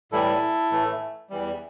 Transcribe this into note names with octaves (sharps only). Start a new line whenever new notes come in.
A2 E3 G3 E4 A4
A2 E3 A3
E2 E3 G3